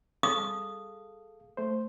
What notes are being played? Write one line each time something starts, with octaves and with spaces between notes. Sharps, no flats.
G#4 A4 F5 D#6
A3 C5